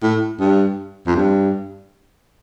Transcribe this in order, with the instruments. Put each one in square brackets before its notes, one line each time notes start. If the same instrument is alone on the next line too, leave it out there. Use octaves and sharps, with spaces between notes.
[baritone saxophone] A2
G2
F2
G2